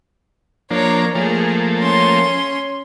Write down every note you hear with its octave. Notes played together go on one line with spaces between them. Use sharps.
F3 A#3 D4 C#5 A#5
F3 A3 A#3 G#4
C#4 C6